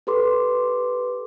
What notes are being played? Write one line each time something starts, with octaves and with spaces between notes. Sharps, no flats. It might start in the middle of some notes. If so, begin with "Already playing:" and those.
G4 A4 B4 C6 D6